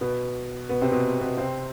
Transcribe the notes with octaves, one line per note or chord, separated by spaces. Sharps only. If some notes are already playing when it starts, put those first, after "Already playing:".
B2 B3
B2 B3
C3 C4
B2 B3
B2 B3
C3 C4